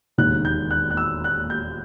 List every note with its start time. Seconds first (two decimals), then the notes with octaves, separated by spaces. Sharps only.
0.18 E1 D#2 D#3 F#6
0.45 G6
0.71 F#6
0.90 F#6
0.97 E6
1.24 F#6
1.50 G6